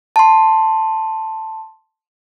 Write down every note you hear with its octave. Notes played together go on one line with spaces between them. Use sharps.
A5 C6